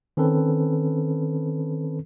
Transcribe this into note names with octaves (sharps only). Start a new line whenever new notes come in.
D#3 C4 C#4 A4 B4